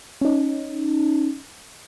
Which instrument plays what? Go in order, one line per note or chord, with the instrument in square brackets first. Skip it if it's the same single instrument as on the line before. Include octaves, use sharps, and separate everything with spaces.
[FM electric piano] C#4 D#4